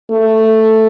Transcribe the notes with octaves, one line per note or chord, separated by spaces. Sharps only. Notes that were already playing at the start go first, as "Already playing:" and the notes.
A3